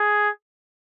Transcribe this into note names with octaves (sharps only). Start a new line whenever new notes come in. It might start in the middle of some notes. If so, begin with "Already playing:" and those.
Already playing: G#4